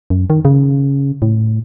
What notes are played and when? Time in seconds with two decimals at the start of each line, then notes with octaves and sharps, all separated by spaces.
0.10 F#2
0.30 D#3
0.45 C#3
1.22 A2